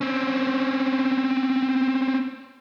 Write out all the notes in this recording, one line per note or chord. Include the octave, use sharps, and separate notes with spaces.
C4 C#4